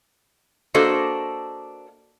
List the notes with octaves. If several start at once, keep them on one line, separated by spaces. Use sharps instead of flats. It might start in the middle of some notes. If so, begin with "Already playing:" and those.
A#3 D4 F#4 A4 C5 D#5